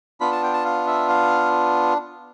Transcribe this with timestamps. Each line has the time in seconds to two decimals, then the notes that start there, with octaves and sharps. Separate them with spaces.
0.20 B3 D4 F4 B5
0.32 A5
0.43 G5
0.54 A5
0.65 F5
0.87 E5
1.09 F5